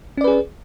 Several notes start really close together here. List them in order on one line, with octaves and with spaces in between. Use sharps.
C#4 D5 B4 G#4